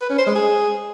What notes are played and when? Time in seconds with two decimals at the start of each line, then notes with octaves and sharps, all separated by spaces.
0.01 B4
0.10 C#4
0.18 C5
0.27 G#3
0.35 G#4